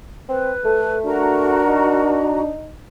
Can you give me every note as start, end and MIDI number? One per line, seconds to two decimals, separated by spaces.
0.29 0.52 60
0.29 0.98 71
0.65 1.61 57
0.65 1.00 69
1.05 2.51 62
1.05 2.40 66
1.05 2.16 70
1.05 2.40 82
1.68 2.74 63